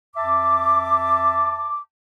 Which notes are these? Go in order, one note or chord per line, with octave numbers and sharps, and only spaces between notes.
F2 E5 A5 D6